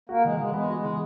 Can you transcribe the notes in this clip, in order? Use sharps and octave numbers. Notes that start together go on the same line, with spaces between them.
A#3 F#4
E3 G#3
E3 G#3
G#3 B3
F#4
G#3
E3